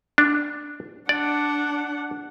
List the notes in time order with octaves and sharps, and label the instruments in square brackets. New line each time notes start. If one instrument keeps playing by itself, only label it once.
[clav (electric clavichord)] D4
[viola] D4 F#5 [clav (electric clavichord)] D5